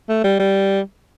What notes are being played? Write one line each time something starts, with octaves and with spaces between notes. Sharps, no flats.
A3
G3
G3